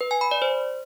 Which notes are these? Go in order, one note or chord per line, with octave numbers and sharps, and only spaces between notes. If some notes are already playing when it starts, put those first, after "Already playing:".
B4
G#5
B5
D5
C5